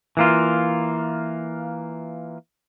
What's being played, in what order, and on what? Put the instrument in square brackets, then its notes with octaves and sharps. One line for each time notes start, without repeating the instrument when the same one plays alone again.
[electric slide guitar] E3 A#3 F4